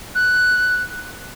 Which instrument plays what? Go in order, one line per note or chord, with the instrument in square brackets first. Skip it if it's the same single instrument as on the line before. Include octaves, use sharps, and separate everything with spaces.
[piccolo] F#6